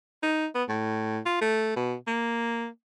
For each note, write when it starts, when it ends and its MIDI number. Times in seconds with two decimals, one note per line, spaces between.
0.23 0.47 63
0.55 0.64 59
0.69 1.20 45
1.26 1.39 65
1.42 1.74 57
1.76 1.95 47
2.08 2.67 58